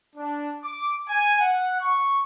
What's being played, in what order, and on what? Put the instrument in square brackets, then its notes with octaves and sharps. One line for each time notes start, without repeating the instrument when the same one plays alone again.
[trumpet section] D4
D6
G#5
F#5
C#6